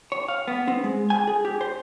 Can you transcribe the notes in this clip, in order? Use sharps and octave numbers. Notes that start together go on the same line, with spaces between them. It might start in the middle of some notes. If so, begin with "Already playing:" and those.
C#5
F5
B3
C4
G#3
G#5
G#4
G4
C5